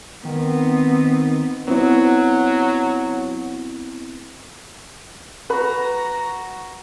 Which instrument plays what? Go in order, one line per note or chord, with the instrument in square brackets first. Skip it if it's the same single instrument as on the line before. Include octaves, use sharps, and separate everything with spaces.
[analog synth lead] D#3 [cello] B3 C4
[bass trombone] F#3 [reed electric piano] B3 C4 E4
[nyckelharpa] F#4 A#5 [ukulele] B4 B5